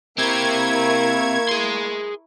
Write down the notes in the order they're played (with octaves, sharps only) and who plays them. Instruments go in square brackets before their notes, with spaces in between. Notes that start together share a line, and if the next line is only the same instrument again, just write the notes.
[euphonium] A#3 [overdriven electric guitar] C4 G4 [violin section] E4 A#4 C#6 [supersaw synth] G#6
[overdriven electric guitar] G#4 C6